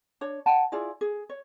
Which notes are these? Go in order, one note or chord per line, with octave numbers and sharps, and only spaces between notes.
D4 C#5
F#5 G5 A5
E4 F4 G#4 D5
G#4
C#5